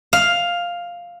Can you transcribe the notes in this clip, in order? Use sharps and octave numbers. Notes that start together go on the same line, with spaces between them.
F5